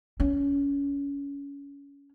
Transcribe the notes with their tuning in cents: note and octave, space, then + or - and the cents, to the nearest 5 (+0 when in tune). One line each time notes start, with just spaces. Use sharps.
C#4 +25